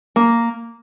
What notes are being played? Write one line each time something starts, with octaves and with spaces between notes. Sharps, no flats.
A#3